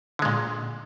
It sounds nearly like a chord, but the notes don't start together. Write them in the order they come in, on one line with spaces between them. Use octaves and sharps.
D3 G#3 A#2